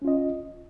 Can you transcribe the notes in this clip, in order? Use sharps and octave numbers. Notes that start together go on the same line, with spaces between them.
C#4 F4 D#5